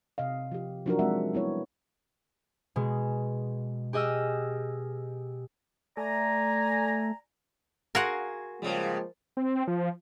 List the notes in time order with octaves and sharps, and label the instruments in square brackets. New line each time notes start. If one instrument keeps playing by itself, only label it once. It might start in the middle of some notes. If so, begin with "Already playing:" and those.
[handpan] C3 D#5 F5
F3 G4
F3 F#3 D4 D#4 F#4 A#4
G#3 C4 E5 F#5
G3 B3 E4 C#5
[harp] B2 G#3
G4 G#4 D#5 E6 F6
[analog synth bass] A3 [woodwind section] D5 G#5 A#5
[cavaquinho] F#4 G#4 C6 [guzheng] A#4 F5 F#5
[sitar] C#3 G3 [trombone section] F3 G#3 A#3
[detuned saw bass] C4
F3